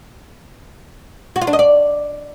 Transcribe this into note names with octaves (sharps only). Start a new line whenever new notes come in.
F#4
F4
D4
D#5
D5